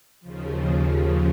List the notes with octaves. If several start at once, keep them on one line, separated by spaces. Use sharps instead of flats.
D#2 C#3 F3